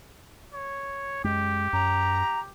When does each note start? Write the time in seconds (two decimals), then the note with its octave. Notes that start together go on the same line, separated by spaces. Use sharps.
0.54 C#5
1.24 F#2 G#3 G4
1.73 F#2 A#5